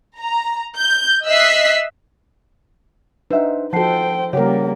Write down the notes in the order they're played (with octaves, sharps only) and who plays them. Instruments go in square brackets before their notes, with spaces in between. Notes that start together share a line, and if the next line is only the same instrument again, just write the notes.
[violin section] A#5
G6
D#5 E5 E6 F#6 B6 C7
[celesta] D4 B4 [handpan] D#4 [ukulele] C5 E5 F#5
[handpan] F3 A4 [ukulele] F#4 F#5 [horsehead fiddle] C5 G5 [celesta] A5 C7
[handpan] C#3 A#4 [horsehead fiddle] G3 A#3 [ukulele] G4 [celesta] C#5 F#5